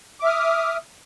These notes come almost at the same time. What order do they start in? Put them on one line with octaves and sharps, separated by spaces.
D6 E5 F6 D#6